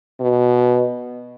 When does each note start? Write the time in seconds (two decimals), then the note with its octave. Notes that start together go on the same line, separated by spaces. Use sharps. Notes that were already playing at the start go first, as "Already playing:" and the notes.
0.20 B2